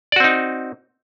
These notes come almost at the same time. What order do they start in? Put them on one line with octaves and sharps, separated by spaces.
D5 F#4 C4 D#4